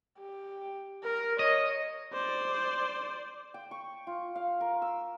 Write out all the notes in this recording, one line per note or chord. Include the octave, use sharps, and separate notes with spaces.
G4
A#4
C#5 D#5
C5 D5
G5
C#6
F4
F5
A#4
E6